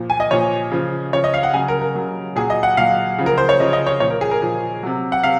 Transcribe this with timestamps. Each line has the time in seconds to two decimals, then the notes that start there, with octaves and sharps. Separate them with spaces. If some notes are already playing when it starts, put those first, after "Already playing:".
Already playing: A#2 F3
0.10 G#5
0.20 D#5
0.31 A#2 F3 C#5
0.72 C#3 F3
1.13 C#3 F3 C#5
1.24 D#5
1.34 F5
1.43 F#5
1.54 C#3 F#3 G#5
1.68 A#4
1.82 A#4
1.95 C#3 F#3
2.36 A#2 F#3 G#4
2.50 D#5
2.63 F#5
2.77 A#2 F#3 F5
3.18 C#3 F3
3.26 A#4
3.38 C5
3.49 C#5
3.60 C#3 F3 D#5
3.73 D#5
3.86 C#5
4.00 A#2 F3 C#5
4.10 A#4
4.21 G#4
4.31 A#4
4.42 A#2 F3
4.83 C3 F#3
5.12 F#5
5.23 C3 F5